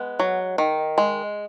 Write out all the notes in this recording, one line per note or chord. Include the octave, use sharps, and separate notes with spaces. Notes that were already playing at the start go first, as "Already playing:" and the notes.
Already playing: G#3 B3
F#3
D#3
G#3